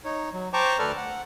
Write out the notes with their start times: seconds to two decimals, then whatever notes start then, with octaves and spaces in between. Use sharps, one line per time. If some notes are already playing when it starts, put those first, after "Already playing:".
0.05 D#4 C#5
0.33 F#3
0.53 C5 G5 A5 A#5 C#6 D6
0.79 D2 A4 B4 D5 F6
0.97 F#5